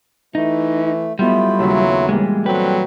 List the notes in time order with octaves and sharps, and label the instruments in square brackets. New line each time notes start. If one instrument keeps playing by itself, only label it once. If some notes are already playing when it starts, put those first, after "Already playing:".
[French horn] E3 [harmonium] A3 [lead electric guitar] D#4
[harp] F#3 B3 D#5 [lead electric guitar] G3 [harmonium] A3 E4 F4
[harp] D#2 C#3 E5 [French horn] F#3
[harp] A#2 E3 G3 [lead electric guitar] G#3
[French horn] F#3 [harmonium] G3 C4 A4 [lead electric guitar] B4 [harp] G5